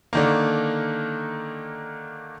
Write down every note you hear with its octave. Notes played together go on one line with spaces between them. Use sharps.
D3 D#3 A#3